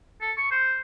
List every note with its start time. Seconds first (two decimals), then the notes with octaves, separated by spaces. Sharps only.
0.21 A4
0.37 C#6
0.51 C5